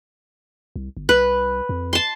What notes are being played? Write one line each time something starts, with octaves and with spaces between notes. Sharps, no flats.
C2
G1
C2 B4
F2
A5 C6